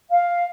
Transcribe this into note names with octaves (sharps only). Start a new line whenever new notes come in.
F5